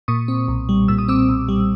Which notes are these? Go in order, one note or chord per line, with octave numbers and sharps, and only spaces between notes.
A#2 C#6 D#6
C4
B1
G3
A#2 E6
D#6
C4 D6 E6
B1
G3